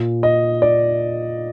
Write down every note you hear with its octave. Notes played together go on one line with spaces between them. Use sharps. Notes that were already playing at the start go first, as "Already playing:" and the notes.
Already playing: A#2
D#5
D5